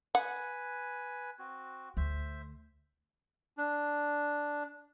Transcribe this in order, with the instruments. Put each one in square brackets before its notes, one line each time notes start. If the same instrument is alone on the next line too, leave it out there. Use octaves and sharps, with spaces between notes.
[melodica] B4 G#5 [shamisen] F#5
[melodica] C4 F#4
[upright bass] D2 [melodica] C5 E5
[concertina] D4